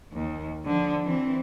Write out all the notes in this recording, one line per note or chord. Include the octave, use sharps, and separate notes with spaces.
D#2
D3 F3
E3 C4